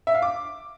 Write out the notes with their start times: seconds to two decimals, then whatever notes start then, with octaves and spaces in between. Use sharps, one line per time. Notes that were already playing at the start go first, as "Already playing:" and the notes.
0.07 E5
0.15 F5
0.22 D6